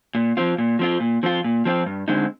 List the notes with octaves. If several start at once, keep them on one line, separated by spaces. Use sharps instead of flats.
A#2
F3 C4 F4
A#2
F3 C4 F4
A#2
F3 C4 F4
A#2
F3 C4 F4
G2
D3 G#3 C4 D#4